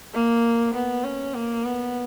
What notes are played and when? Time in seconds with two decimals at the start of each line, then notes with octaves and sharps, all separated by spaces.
0.14 A#3
0.74 B3
1.04 C#4
1.34 A#3
1.65 B3